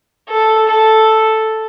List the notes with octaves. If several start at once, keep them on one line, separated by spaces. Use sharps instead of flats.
A4
A4